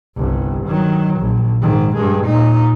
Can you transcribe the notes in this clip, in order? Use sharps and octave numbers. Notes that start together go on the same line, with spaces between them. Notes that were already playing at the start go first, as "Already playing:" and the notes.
G1 C2
D#3 F#3
A#1
G#2 D#3
G2 G#3
A#2 D#4